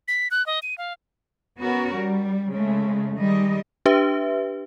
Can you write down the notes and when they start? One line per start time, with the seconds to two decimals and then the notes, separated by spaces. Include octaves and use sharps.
0.08 B6
0.31 F#6
0.46 D#5
0.63 D#7
0.78 F5
1.59 B3 C#4 F#4 A#4
1.95 G3
2.52 C#3 G#3 A3
3.18 D#3 G3 G#3 D#5
3.86 D4 G4 B4 E5